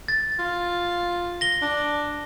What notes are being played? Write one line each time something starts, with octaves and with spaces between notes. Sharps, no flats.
A6
F4
A#6 G7
D4